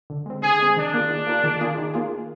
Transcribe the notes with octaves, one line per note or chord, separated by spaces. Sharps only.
D3
G#3 C4
D3 G#4
G#3 C4
D#3 D4
A#3 F4 G#4
D#3
A#3 F4 G#4
D#3
A#3 F4 G#4
D#3
A#3 F4 G#4